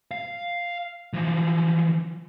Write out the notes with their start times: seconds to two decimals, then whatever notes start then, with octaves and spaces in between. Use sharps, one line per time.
0.11 F5
1.13 E3 F3